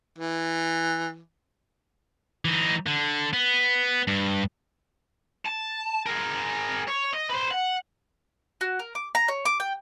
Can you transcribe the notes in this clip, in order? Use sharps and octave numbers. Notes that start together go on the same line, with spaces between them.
E3
E3 D#4
D3
B3
G2
A5
G#4 A#4
C#5
D#5
B4 C5
F#5
F#4
A#4
D6
A#5
C#5
D6
G5